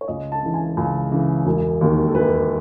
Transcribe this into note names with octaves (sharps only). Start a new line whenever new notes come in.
C#5
C#2 D#5
A5
C#3 E3
G#5
C#2 G#5
C#3 E3
E1
D#2 D#3
A4
E1 B4